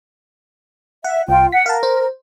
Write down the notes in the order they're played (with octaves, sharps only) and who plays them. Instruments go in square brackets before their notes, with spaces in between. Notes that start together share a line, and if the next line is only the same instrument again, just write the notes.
[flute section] E5 [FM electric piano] F#5
[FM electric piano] C2 [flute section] F4 G5
[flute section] F#5 [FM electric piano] B6
[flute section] A#4 [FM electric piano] F5 F#5 A5
[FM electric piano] C5